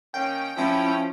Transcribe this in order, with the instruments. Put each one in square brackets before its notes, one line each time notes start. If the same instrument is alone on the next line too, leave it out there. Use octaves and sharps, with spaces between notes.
[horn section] D#3 A#3 C#4 [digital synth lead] G5
[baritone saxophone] F3 [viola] C#4 [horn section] E4